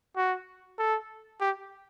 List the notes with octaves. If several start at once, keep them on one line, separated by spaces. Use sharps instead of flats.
F#4
A4
G4